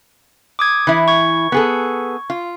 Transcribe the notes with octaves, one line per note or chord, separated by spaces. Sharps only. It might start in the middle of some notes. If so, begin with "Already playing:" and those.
D6 D#6 G#6
E3 E4
C#6 G#6
B3 G#4 A4
F4